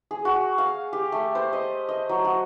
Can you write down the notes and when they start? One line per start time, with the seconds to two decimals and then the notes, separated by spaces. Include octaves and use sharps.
0.11 G#4
0.25 F#4
0.58 F5
0.93 G4
1.12 A3
1.35 C5
1.53 D#5
1.89 D#5
2.09 F#3
2.25 F#4